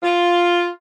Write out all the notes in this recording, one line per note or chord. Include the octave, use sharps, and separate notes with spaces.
F4